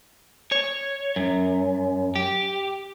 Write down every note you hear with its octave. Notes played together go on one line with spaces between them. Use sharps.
C#5
F#2
G4